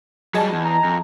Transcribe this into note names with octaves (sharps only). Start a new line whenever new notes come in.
F#3 G3 G#4 D#5 A5
E2
A#5
F2